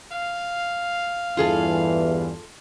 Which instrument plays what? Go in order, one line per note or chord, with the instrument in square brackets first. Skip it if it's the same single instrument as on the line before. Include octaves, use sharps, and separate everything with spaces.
[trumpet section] F5
[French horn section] E2 G2 E3 [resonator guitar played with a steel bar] F4 G#4 A4